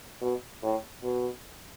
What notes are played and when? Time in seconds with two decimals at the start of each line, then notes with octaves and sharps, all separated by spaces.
0.21 B2
0.63 A2
1.03 B2